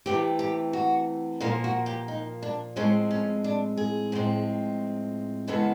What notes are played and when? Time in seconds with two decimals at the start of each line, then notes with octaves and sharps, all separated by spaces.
0.06 C3 E3 A3 G4
0.39 G4
0.73 F#4
1.40 A#2 F3 A#3 F4
1.64 F#4
1.86 G4
2.08 D#4
2.43 D4
2.76 A2 F3 G#3 C4 C#4
3.11 C#4
3.44 D4
3.77 G#4
4.12 A2 F3 G#3 C4
5.47 F#2 C#3 E3 G#3 B3 A4